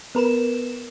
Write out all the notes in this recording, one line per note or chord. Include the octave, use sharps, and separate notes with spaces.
B3 A#4 B4 E7